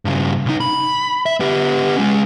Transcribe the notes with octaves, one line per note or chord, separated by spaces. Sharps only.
G2 C#3
B1 D#4
B5
E5
B3 G4
G#3 C#4